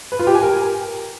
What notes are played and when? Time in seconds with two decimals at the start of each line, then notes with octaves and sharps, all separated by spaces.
0.12 B4
0.19 F4
0.27 G4
0.35 G#5
0.42 A#4